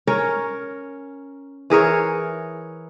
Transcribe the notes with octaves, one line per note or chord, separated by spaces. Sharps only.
C#4 A#4 C#5
E3 G#4 A#4 C#5